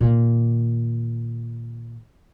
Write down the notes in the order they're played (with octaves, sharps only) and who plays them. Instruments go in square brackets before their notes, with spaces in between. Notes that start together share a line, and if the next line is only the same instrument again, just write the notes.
[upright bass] A#2 D#3